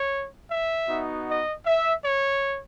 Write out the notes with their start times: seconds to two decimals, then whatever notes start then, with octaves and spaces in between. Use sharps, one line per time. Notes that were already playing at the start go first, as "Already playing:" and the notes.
Already playing: C#5
0.49 E5
0.88 B3 D#4 F#4
1.27 D#5
1.66 E5
2.05 C#5